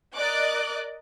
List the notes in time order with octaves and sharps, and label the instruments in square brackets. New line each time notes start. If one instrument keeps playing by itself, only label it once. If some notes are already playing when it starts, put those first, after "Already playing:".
[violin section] A#4 D5 D#5 D6 F#6